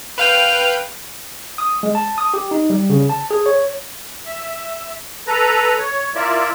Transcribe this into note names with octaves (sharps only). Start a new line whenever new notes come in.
B4 F5 G5 F7
D#6
G#3
A5
D#6
G4
D#4
G3
C#3
A5
G#4
C#5
E5
A4 B4 A#5
C#5
E4 F4 A#4 D5 E5